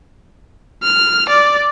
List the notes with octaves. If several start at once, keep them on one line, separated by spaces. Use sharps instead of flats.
F6
D5